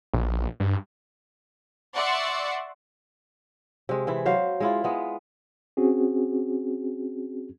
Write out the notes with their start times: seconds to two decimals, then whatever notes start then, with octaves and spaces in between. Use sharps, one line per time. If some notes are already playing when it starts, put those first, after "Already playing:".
0.14 A#1
0.60 G2
1.95 D5 E5 F#5 C6 C#6 E6
3.89 C3 G#3
4.07 E3 E4
4.26 F#3 C5 F5
4.60 G#3 E4 F4
4.84 G#3 B3
5.77 C4 C#4 F#4 G#4